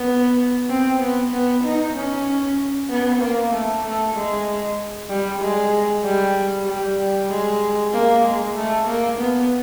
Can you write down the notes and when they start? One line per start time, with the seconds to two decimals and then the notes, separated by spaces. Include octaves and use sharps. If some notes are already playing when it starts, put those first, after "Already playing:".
Already playing: B3
0.69 C4
1.01 B3
1.32 B3
1.64 D#4
1.95 C#4
2.89 B3
3.21 A#3
3.52 A3
3.84 A3
4.15 G#3
5.09 G3
5.41 G#3
6.04 G3
6.67 G3
7.30 G#3
7.93 A#3
8.25 G#3
8.55 A3
8.87 A#3
9.19 B3